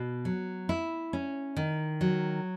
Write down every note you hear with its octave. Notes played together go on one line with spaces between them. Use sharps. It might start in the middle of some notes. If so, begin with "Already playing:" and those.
Already playing: B2
F#3
E4
C#4
D#3
F#3